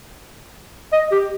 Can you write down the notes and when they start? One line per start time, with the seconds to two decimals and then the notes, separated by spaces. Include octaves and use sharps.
0.93 D#5
1.11 G4